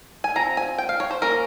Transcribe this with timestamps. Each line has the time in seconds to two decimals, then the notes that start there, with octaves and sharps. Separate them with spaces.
0.24 G#5
0.36 F3 C4 A#5
0.57 G#5
0.78 G5
0.89 F5
1.00 C#5
1.11 C5
1.22 F3 A#3 C#4 A#4